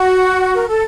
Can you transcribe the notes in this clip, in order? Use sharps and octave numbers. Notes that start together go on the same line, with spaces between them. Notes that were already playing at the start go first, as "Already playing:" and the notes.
Already playing: F#4
A#4
A4